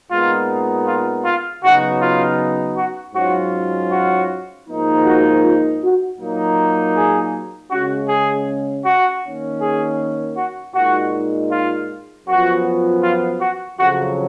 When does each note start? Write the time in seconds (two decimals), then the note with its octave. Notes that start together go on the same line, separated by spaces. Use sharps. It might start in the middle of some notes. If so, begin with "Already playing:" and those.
0.11 A#2 G#3 B3 D#4 F4
0.87 F4
1.25 F4
1.63 C#3 F#3 B3 D#4 F#4
2.01 F4
2.77 F#4
3.15 G#2 F#3 C#4 F4 F#4
3.92 F#4
4.68 G#2 F3 A#3 D#4
5.05 F#4
5.43 F4
5.82 F#4
6.19 A#2 F#3 A#3 D#4
6.95 G#4
7.71 C#3 G#3 C#4 F#4
8.09 G#4
8.85 F#4
9.24 D#3 A#3 C#4
9.61 G#4
10.37 F#4
10.75 A#2 G#3 D#4 F#4
11.51 F4
12.27 F#2 F3 B3 F4 F#4
13.03 F4
13.41 F#4
13.79 F2 C#3 F#3 F#4